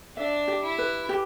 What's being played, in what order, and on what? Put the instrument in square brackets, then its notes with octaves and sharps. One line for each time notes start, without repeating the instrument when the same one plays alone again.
[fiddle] D4 [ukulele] E5
[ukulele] G4
[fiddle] E4
[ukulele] B4
G4